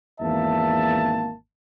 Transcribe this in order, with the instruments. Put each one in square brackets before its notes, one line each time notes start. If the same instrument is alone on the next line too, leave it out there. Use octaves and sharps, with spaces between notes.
[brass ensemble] G#1 E2 A#3 E5 A5